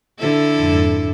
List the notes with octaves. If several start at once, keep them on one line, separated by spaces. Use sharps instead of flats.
D3 E4 A4
F2 G#2